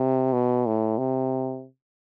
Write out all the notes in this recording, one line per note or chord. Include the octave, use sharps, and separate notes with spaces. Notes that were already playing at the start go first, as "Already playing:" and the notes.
Already playing: C3
B2
A2
C3